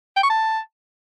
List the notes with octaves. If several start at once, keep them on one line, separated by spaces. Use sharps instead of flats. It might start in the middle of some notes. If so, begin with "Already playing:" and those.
G5
C#6
A5